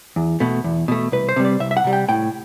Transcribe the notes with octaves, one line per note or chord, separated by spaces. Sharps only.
E2
B2 A3
E2
B2 A3
C2 B4
C5
C3 G3
D5
C2 E5
E5
F#5
C3 G3
G5
A2 G5